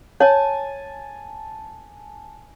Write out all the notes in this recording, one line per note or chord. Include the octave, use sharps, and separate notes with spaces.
C#5 G#5 A5